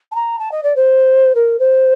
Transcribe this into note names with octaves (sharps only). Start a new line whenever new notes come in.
A5
A#5
A5
D#5
D5
C5
A#4
C5